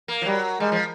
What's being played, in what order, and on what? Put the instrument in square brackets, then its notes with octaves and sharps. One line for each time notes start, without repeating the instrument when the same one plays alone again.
[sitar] A#3
F3
[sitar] F#3 [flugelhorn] G3
[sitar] G3 [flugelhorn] G#3
[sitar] F3